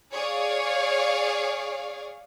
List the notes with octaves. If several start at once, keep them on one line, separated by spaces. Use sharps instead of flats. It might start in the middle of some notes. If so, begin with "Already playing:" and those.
G#4 C#5 D5 F5